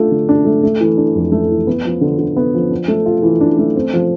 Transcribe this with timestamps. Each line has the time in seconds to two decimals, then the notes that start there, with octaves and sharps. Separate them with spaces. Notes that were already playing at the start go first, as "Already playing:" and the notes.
Already playing: A3 D4 F4
0.11 D3
0.29 D4
0.45 A3
0.63 A3
0.81 E3
0.97 D4
1.15 F2
1.32 A3
1.50 E3
1.67 B3
1.85 F3
2.01 D3
2.19 D3
2.36 B3
2.54 F3
2.71 D4
2.88 A3
3.06 F4
3.23 E3
3.41 D4
3.59 A3
3.76 C4
3.93 F3